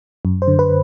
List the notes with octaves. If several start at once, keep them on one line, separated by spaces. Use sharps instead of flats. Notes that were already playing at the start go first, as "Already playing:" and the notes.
F#2
C5
D3
B4